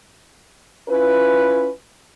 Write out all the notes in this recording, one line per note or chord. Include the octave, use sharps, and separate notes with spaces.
C#4 E4 F4 B4